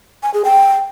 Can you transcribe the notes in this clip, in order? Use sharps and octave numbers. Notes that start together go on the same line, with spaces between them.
G#5
G#4
G5